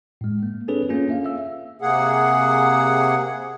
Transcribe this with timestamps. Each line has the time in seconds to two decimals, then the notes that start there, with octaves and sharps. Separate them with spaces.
0.21 A2 G#3
0.43 A#3
0.68 C4 D4 G#4 A4 B4 C#5
0.89 A#3 C#4 F4 G#4 A4
1.10 E5 F5
1.25 E5 E6
1.82 C3 A#3 G#4 F#5